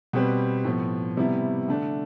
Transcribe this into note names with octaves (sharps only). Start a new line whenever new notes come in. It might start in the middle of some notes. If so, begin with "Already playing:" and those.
B2 G3 C4 G4 B4
A2 F3 B3
C3 G3 B3 E4
D3 A3 D4